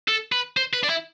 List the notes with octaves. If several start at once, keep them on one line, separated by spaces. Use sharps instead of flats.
A4
B4
C5
B4
D4
E4